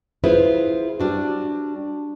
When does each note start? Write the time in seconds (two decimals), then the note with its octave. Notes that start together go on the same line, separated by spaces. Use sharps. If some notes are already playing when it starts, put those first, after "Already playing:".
0.24 E4 F4 G#4 B4 C5 E5
1.00 G3 D4 F#4